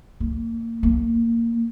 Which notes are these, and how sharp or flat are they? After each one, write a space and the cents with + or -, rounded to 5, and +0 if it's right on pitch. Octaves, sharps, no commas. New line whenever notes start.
A#3 -25
A#3 -15